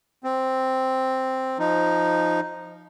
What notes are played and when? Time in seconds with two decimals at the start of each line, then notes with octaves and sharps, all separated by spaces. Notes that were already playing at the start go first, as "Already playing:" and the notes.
0.24 C4
1.59 F3 D#4